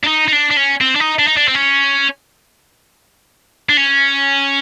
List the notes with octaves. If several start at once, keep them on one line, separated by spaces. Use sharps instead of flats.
D4
D#4
D#4
D4
D4
C#4
C4
D4
D#4
D4
D#4
D4
C4
C#4
D4
C#4